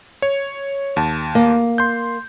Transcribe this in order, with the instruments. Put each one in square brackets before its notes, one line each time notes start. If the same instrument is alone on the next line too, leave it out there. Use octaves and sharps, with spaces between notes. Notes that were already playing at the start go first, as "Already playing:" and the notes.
[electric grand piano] C#5
D#2 A5
[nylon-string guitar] A#3
[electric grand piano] C6 G6